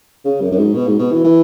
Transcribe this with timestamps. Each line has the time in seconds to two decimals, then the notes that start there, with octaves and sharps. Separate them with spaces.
0.25 C#3
0.41 F#2
0.51 F#2
0.58 G#2
0.74 B2
0.87 G#2
0.99 B2
1.12 E3
1.24 E3